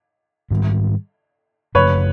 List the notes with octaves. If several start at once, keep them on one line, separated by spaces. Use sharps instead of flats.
G#2 D#3 G3
F#2 C#3 F3 A3 B4 C#5